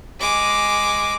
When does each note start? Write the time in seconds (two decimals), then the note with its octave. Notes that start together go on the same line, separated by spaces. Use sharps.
0.19 G#3 D6